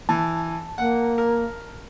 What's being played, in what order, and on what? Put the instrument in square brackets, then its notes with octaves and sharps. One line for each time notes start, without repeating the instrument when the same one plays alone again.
[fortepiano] E3 [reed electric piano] A5
[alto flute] A#3 [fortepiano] F#5
[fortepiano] A#4